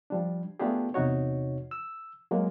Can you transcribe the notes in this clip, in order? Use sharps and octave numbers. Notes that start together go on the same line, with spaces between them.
F3 G3 D4
A3 B3 D4 F4 G4 G#4
E2 C3 D#4 F#4 C#5
E6
F#3 G#3 A#3